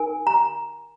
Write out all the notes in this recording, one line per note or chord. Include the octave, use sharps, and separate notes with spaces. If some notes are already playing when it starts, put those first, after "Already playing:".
Already playing: D#4 A#4 G#5
A#5